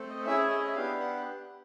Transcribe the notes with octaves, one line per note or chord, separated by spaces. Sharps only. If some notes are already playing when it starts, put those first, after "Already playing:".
Already playing: A3 C4 A4
D#5
C#4 E4 G#4 E5
D#5
E5
B3 D4 G4 F5
F#5